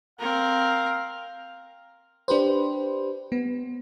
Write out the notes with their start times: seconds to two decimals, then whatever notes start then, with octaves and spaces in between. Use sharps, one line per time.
0.20 C4 A#4 F5
2.28 D4 G4 B4 C5
3.32 B3